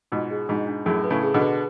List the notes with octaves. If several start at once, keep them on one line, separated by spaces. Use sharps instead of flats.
G#2 B2 F4
G#4
G#2 B2 D4
D4
F#2 A2 G#4
B4
A2 C#3
G#4
B2 D3
B4